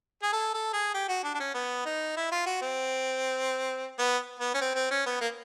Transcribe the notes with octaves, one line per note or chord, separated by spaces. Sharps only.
G#4
A4
A4
G#4
G4
F#4
D4
D4
C#4
B3
D#4
E4
F4
F#4
C4
B3
B3
C#4
C4
C4
C#4
B3
A#3